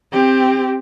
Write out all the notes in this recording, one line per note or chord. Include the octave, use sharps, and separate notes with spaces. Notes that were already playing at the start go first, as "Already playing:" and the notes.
C4 G4